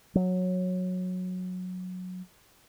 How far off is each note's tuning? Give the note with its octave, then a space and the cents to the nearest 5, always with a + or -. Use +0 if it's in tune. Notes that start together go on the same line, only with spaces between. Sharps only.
F#3 -15